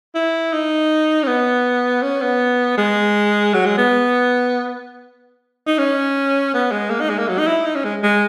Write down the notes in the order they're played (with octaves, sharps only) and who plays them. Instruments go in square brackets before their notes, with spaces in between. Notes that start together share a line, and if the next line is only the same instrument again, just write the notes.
[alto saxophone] E4
D#4
C#4
B3
C#4
B3
G#3
F#3
G#3
B3
D#4
C#4
B3
G#3
A#3
D#4
G#3
A#3
F#3
D#4
E4
D#4
C#4
G#3
G#3